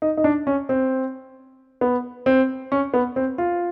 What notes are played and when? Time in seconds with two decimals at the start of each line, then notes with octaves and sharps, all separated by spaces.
0.02 D#4
0.17 D#4
0.24 D4
0.47 C#4
0.69 C4
1.81 B3
2.26 C4
2.72 C#4
2.94 B3
3.16 C4
3.38 F4